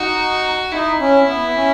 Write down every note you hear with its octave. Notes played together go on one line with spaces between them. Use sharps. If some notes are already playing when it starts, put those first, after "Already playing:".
Already playing: D#4 F#4
D#4 E4
C#4
B3
C#4